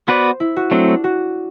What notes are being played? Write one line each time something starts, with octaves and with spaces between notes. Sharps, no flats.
B3 F#4 B4 C5 D5
E4
F#4
F#3 A3 C4 D4
D4
F#4